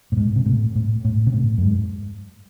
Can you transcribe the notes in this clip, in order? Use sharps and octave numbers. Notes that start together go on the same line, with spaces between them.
A2
G#2
C3
A2
A2
A2
C3
A2
F#2
G#2